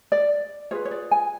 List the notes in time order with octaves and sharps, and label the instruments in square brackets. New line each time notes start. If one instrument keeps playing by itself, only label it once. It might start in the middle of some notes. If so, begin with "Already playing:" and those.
[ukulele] D5
F4 G#4 B4 C#5
C#5
D5
G#5